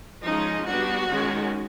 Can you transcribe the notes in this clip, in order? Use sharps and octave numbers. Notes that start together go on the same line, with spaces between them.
F3 G#3 C#4 D#4
G3 B3 D4 F#4
D#3 G#3 C#4